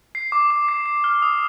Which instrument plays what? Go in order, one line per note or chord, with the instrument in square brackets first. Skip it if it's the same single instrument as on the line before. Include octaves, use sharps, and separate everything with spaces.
[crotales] C7
D6
D6
C7
C7
F6
D#6